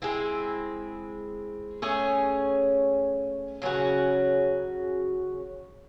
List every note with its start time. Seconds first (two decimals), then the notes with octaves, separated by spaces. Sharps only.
0.02 G#3 C4 E4
1.82 A3 C#4 G#4 C#5
3.62 C#3 F#3 C#4 F#4